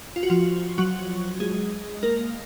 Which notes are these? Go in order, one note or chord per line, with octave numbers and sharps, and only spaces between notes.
F4
F#4
F3 F4
F#3 F#4
G#3 G#4
A#3 A#4